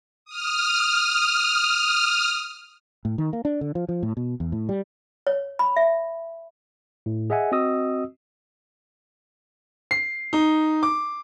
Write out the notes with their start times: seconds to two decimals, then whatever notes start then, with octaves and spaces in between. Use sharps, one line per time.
0.25 D#6 F6
3.05 A2
3.18 D#3
3.33 A#3
3.45 D4
3.61 D3
3.75 F3
3.89 F3
4.03 A2
4.17 B2
4.40 E2
4.52 A2
4.69 G3
5.27 C#5
5.59 B5
5.76 E5
7.06 A2
7.30 G#4 D#5 E5 F#5 G#5
7.52 C4 F#4 D#5 D#6 E6
9.91 C7
10.33 D#4
10.83 D6